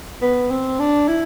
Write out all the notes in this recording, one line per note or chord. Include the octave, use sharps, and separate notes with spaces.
B3
C4
D4
E4